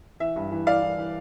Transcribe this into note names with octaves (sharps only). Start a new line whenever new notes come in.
E3 E5
G2
E3
E3 D5 F5
E3
E3